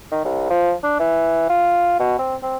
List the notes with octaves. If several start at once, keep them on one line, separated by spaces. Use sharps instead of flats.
D#3
C2
F3
D4
E3
F4
B2
C4
C4